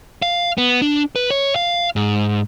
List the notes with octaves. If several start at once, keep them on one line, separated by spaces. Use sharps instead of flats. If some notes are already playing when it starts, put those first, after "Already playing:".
F5
B3
D4
B4
C#5
F5
G#2